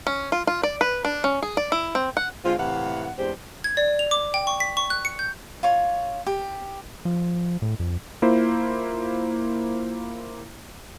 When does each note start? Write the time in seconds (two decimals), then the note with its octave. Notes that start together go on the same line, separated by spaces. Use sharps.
0.07 C#4
0.32 F4
0.47 F4
0.63 D5
0.81 B4
1.05 D4
1.24 C#4
1.42 G#4
1.57 D5
1.72 E4
1.95 C4
2.17 F#5
2.44 D3 G#3 C4 F4
2.57 A2 C3 E3 F5 F#5
3.17 E2 G#3 C4 D4 G4 C5
3.64 G#6
3.77 D5
3.99 F7
4.11 D6
4.34 G5
4.47 C#6
4.60 B6
4.77 C#6
4.90 F#6
5.05 C#7
5.19 G6
5.63 F4 C#5
6.26 G4
7.05 F3
7.62 A2
7.80 F2
8.22 A#3 E4 F4 C5